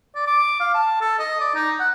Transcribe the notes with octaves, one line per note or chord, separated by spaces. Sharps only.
D5
D6
F5
A5
A4
D#5
D5
D#4
F#5